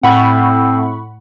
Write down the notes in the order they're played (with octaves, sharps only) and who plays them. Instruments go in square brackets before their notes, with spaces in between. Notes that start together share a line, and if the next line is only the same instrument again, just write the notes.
[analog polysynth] A2 [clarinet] C4 [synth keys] F#5 B5 C#6